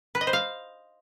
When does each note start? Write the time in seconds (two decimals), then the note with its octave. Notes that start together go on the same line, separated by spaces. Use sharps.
0.15 B4
0.21 D#5
0.27 C5
0.33 F5